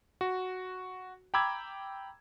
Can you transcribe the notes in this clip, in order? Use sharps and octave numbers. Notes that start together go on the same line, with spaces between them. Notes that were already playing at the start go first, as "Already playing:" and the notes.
F#4
G5 A#5 B5 D6 E6 G#6